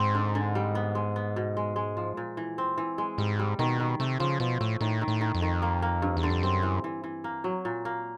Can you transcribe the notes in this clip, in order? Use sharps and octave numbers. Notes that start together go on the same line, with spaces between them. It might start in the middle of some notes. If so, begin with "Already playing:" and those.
Already playing: G#2 C4
D3
D3
G3
B3
G#3
B3
B2
G#3
G#3
F3
A#2
E3
C4
E3
G#3
G#2 G3
G3
B2 D#3
D#3
C3 A3
C#3 F3
B2 F3
A2 A3
A2 D#3
D#3
A2
D#3
F2
D#3
A#3
A#3
G2
E2
D3
F2
F#2 C4
E3
E3
E3
A#3
F#3
A#2
A#3